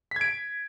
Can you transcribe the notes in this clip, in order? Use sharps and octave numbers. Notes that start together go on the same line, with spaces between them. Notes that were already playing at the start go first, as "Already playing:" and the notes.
G#6 B6 D7